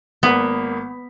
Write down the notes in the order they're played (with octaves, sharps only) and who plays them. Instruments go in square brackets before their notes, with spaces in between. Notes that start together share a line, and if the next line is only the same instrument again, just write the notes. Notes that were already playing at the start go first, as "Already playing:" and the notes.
[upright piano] G#1 A#3 B6 [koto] B3